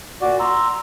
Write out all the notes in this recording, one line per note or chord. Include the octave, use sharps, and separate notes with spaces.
A#2 F#4 D5
A#5 C6 E6